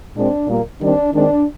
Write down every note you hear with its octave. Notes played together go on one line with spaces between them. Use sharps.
A#2 G#3 C4 D4
A#2 G3 A#3
D#3 G3 C4 D4
D#3 G#3 C4 D4